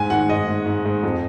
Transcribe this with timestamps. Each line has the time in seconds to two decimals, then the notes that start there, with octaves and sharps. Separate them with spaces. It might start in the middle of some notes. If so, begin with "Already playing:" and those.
Already playing: G#2 G#5
0.10 D#3 F#5
0.29 G#2 D#5
0.47 G#2
0.66 G#2
0.85 G#2
1.03 F2